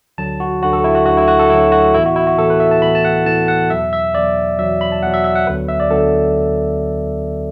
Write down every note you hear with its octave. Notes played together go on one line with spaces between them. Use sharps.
D2 D3 F#3 A5
F#4
D2 D3 F#3 F#4
A4
E4
F#4
D2 D3 F#3 F#4
E4
F#4
A4
D2 D3 F#3 E4
F#4
A2 E3 B3 E4
F#4
E4
F#4
A2 E3 B3 A4
B4
E5
A5
A2 E3 B3 B5
A5
F#5
A2 E3 B3 A5
F#5
E2 B2 F#3 E5
E5
E2 B2 F#3 D5
E2 B2 F#3 E5
B5
A5
E2 B2 F#3 F#5
E5
E5
F#5
D2 D3 F#3 B3 B4
E5
D5
D2 D3 F#3 B3 A4